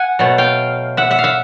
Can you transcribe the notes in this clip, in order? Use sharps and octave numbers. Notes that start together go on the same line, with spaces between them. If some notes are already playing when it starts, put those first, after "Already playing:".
Already playing: F#5 G#5
B2 F#3 A3
F5 G5
E5 F#5
E5 F#5
F5
E5 F#5